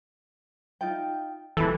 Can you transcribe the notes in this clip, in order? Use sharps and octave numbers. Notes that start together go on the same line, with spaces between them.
D#4 F4 G5
G#1 E3 G4 A4 B5